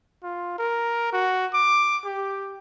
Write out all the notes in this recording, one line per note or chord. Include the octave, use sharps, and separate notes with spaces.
F4
A#4
F#4
D6
G4